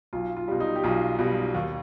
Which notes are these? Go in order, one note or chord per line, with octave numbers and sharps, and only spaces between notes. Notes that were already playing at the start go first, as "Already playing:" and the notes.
B1 F4
F4
B2 G3
D#4
G4
B1 F4
B2 G3
D#2